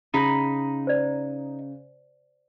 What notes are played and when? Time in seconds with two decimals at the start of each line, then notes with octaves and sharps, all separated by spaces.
0.14 C#3 D#4 B5
0.87 C5 D5